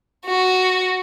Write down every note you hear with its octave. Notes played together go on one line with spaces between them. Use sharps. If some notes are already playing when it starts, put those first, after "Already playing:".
F#4